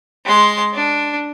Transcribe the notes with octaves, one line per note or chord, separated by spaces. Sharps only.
G#3 C6
D4